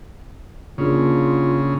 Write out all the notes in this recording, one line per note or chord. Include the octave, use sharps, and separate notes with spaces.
C#3 A#3 D4 F4 G#4